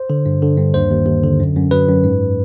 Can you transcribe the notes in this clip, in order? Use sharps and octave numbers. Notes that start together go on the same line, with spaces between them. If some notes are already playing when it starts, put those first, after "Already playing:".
Already playing: C5
D3
G2
D3
G2
D#2 C5
D#2
D#2
D3
F#2
F#2
F#3 B4
F#2
G#2